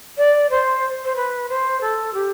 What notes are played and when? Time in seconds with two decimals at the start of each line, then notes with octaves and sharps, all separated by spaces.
0.18 D5
0.50 C5
1.04 C5
1.16 B4
1.49 C5
1.81 A4
2.14 G4